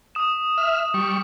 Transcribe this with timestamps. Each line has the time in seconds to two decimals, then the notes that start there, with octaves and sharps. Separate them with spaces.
0.15 D#6 E7
0.58 E5 F6
0.94 G3 C#6